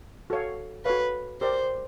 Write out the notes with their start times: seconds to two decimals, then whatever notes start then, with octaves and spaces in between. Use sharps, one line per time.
0.30 F#4 A4 C#5 F5
0.85 F#4 A4 B4 C#5 F5
1.41 G4 A#4 C5 D5